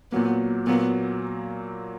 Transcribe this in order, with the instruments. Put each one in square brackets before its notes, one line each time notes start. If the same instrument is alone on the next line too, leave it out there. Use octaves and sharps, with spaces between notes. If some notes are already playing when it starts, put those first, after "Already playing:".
[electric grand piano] A#2 F#3 A#3 [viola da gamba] B3
[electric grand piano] A#2 F#3 A#3 [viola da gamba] B3